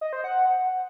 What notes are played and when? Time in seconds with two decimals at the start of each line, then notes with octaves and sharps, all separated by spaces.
0.01 D#5
0.13 C5
0.24 F#5